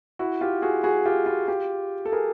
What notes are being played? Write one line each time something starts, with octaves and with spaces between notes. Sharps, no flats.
E4 F#4
F4 G4
F#4 G#4
F#4 G#4
F4 G4
F4
F4 G4
A4
G#4 A#4